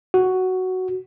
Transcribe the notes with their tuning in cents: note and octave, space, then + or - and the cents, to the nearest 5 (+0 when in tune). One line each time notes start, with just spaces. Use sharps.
F#4 +5